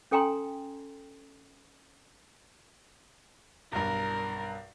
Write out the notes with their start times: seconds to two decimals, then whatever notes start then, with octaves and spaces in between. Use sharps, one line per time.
0.11 C#4 A4 G5 G#5 A#5 C6
3.73 B1 G2 A#4